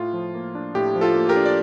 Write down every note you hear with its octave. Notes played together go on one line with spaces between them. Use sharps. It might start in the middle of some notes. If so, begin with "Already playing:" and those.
Already playing: A2 F4
F3
A#3
D4
A2 G4
F3
F4 A4
A#3
G4 A#4
D4
D5